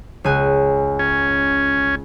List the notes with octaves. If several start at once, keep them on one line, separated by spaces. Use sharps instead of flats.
C#2 G#5 F#6
C#4